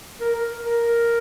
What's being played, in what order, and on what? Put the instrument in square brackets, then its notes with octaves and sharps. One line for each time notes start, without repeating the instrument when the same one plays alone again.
[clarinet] A#4
A#4
A#4